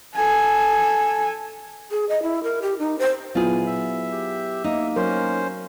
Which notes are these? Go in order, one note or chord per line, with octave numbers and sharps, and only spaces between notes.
A4 G#5
G#4
D#5
E4
A#4
G4
D#4
C5
A#2 F#3 B3 E4 F4 G#4
E5
G4
A#3 D#4
F#3 C#4 A#4 C5